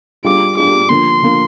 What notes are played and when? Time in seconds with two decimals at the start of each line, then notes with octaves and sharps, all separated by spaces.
0.24 G3 D4 F4 G#4 D6
0.57 G3 D4 F4 G#4 D6
0.89 D3 F3 A#3 C6
1.22 D3 F3 A#3